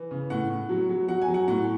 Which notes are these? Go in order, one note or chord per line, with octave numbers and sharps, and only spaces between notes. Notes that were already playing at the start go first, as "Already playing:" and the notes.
Already playing: E3
C#3
A2 F#5
A2
F#3
F#3
F#3 F#5
G#5
F#3
F#5
A2 F#5